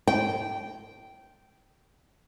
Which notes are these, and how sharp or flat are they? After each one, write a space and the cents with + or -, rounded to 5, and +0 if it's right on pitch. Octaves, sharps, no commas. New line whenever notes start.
G5 -10